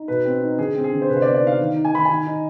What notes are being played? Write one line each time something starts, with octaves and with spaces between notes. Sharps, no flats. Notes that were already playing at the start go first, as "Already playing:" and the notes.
Already playing: D#4
B2 B4
C4
D#4
D3 G#4
C4
G#4
D3
C5
C3 B4
C5
B3 D5
D5
D#4 F5
D#3
D#4
G#5
D#3 B5
D#3 G#5
D#4